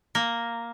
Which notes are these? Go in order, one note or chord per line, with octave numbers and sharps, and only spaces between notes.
A#3